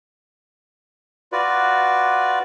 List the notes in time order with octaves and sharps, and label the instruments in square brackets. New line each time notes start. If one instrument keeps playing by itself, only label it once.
[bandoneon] F4 F#4 B4 D5